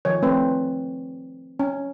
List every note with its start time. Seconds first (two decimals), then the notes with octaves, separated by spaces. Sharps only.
0.05 D#3 F3 C#5
0.23 A3 C4 B4
1.59 C#4